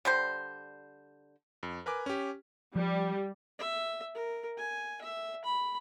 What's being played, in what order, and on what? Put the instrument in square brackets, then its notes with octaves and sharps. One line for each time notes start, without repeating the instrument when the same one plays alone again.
[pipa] D3 G3 C5
[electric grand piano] F2
A#4 B4 G#5 D6
C#4 G4
[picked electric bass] F3 [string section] G3
[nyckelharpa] E5
A#4
G#5
E5
B5